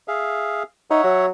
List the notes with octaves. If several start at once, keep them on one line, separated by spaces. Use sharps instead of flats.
G#4 E5 F5
D#4 C#5 E5 F#5
F#3